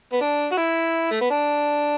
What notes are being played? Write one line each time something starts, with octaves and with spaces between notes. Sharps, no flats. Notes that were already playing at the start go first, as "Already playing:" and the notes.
B3
D4
F#4
E4
A3
B3
D4